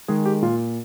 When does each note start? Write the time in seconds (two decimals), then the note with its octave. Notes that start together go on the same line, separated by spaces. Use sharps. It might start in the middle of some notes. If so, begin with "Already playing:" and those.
0.08 D#3 G#3 G#4
0.26 G4
0.42 A#2 F4